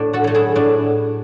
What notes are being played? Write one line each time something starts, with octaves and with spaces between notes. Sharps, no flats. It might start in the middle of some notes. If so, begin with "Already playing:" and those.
Already playing: A2 D4
F#4 A4
F#3 A3
E4 G#4
A2 D4